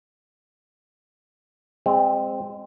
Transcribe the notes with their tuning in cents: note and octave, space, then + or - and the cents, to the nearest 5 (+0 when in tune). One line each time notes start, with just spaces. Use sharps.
G#3 -30 C4 +0